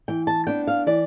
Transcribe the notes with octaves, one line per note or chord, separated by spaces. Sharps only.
E3 G5
A5
B3 D4 G5
F5
E3 D5